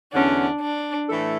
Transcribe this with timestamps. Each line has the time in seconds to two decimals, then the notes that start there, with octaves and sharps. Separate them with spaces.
0.13 E2 D3 F#3 C#4 D4
0.60 D4
1.08 A2 E3 A3 E4 A4